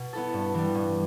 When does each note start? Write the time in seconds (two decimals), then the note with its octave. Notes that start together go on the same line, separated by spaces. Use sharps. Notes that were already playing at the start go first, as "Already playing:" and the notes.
Already playing: B2
0.13 B3 E4 A4
0.34 G2
0.54 E3 G3
0.75 G2